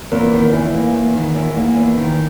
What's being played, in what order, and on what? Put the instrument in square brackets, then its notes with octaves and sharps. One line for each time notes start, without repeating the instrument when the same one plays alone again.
[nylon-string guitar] E2 [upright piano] A#3
[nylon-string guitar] D#3
[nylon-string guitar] E2 [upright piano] E3
[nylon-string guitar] A#3
E2
D#3
E2
A#3
E2
D#3